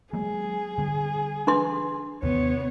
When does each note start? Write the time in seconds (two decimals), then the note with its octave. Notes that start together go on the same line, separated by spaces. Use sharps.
0.13 F#3 G#3 A#3 G#4
0.78 D3 G3
1.47 D4 B4 C6
2.23 D#2 C3 E3 B3 C#5